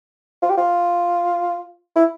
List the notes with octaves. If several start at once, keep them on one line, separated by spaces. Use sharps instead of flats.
F4
G4
F4
E4